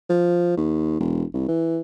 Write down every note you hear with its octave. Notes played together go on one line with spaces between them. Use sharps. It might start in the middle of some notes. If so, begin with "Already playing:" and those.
F3
D#2
E1
C2
E3